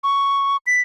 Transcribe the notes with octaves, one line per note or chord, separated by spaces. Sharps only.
C#6
B6